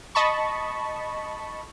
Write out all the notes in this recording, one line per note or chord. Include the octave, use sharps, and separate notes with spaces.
D#5 A5 B5 C#6